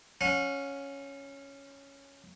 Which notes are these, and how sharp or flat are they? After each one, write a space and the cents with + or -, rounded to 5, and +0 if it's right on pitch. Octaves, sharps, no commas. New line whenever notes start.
C#4 +0 F#5 -40